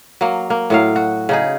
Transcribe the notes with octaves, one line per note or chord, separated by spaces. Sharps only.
F#3 A#3
A#3
A2 F#3 F5
F#4
C#3 D#4 G#4